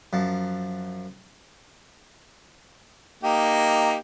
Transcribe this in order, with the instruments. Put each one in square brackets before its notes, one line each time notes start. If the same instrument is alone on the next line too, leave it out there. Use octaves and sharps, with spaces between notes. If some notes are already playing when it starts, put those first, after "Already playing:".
[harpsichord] F#2 F3 A5
[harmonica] A#3 D#4 G4